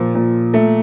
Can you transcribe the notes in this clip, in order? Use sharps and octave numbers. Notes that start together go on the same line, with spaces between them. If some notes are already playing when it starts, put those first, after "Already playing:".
Already playing: A#2 F3
A#2
A3